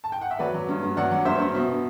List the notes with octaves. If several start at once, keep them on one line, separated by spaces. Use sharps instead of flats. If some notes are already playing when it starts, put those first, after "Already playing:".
A5
G5
F#5
E5
F#3 B4 D5
F#3
G2
G2
F#3 D5 F#5
F#3
G2 C5 E5
G2
B2